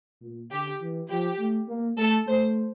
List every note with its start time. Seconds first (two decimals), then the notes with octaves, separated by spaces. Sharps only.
0.21 A#2
0.51 D3 G4
0.81 E3
1.10 F3 G4
1.39 A3
1.68 A#3
1.97 A3 A4
2.27 A3 C5